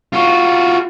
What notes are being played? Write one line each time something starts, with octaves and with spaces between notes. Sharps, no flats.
F4 F#4